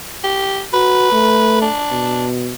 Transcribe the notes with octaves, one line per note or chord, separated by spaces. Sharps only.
G4
F#4 B4
A3
D4
B2